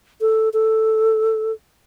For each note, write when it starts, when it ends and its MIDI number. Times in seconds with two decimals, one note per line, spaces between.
0.21 0.49 69
0.53 1.52 69